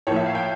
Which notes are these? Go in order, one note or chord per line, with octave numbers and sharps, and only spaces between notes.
A2 F3 A#3 C#5
E5
F5
G5